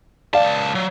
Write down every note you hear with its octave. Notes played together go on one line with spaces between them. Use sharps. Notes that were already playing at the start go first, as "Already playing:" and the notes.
C#2 D5 F5 A5
F#3